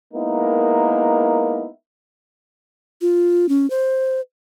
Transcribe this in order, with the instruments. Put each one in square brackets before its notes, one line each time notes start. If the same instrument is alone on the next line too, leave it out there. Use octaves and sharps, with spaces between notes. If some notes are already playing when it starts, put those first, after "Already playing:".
[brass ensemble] G#3 A#3 B3 D#4 E4 A#4
[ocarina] F4
C#4
C5